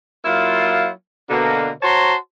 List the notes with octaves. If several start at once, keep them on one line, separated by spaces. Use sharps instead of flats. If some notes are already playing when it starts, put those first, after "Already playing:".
F#3 A#3 E4 F4
B2 D3 A#3
F#4 C5 C#5 A5 A#5 C6